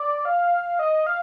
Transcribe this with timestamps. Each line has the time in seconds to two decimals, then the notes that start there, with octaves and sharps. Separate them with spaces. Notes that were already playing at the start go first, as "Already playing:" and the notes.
Already playing: D5
0.25 F5
0.79 D#5
1.07 F5